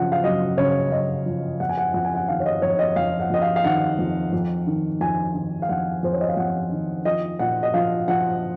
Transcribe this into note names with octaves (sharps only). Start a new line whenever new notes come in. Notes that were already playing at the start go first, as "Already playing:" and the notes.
Already playing: F#2 C#3 F3 F#5
F5
F#2 D#5
C#3 C#5
F#2 D#5
F3
F2 F#5
G#5
F#5
F2 F#5
G#5
F#5
D#3 F5
C#5
D#5
F2 C#5
D#5
F2 F5
F#5
F2 D#5
F5
F5
D#3 F#5
F2
F2
D#3
F2 G#5
D#3
F5
F2 F#5
F2 C5
C#5
D#5
F5
F2 F#5
D#3
F3 D#5
A#2 F#5
D#5
F3 F5
F3 F#5